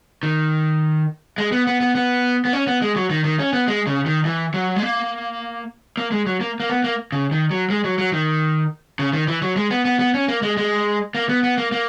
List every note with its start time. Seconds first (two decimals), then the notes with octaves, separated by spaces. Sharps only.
0.23 D#3
1.38 G#3
1.52 B3
1.67 B3
1.81 B3
1.95 B3
2.45 B3
2.53 C#4
2.67 B3
2.82 G#3
2.96 F#3
3.10 D#3
3.25 D#3
3.39 C#4
3.53 B3
3.68 G#3
3.87 C#3
4.06 D#3
4.25 E3
4.54 F#3
4.76 G#3
4.82 A#3
5.97 A#3
6.12 G#3
6.26 F#3
6.41 A#3
6.60 A#3
6.69 B3
6.84 A#3
7.12 C#3
7.32 D#3
7.51 F#3
7.70 G#3
7.84 F#3
7.99 F#3
8.13 D#3
8.99 C#3
9.13 D#3
9.28 E3
9.42 F#3
9.56 G#3
9.71 B3
9.85 B3
9.99 B3
10.14 C#4
10.28 A#3
10.43 G#3
10.57 G#3
11.15 A#3
11.29 B3
11.43 B3
11.58 A#3
11.72 A#3